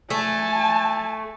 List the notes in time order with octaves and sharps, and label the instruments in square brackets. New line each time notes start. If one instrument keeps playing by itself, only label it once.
[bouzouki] A3 [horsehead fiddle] G#5 A5